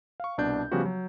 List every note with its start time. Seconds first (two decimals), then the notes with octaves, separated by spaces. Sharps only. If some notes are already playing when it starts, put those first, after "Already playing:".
0.20 F5 C#6
0.38 C2 B2 D4 G6
0.71 C#3 F3 G3 B3 F#4 G4
0.85 F#3